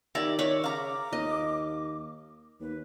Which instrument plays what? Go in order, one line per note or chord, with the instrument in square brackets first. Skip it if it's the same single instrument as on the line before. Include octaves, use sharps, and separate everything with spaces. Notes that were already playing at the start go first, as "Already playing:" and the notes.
[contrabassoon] D#3 [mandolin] E4 G4 D5 [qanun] A#5
[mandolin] C#5 D5 [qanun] E5
[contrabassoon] C#3 [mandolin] F5 A#5 [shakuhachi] D6
[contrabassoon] D#2 [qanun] D#5
[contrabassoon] D#2 [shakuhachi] B4